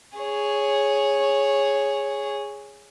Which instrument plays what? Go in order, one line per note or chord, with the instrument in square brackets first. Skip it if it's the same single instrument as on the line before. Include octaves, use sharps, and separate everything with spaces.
[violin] G#4 C#5